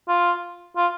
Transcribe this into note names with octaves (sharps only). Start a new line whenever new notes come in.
F4
F4